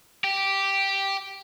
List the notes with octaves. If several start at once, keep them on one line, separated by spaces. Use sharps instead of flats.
G4